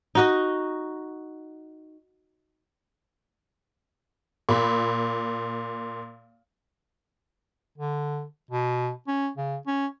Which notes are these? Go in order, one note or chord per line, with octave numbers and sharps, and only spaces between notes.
D#4 F#4 D#5
A#2 B5
D3
B2
C#4
C#3
C#4